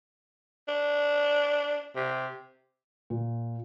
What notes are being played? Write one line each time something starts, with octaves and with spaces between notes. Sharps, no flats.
D4
C3
A#2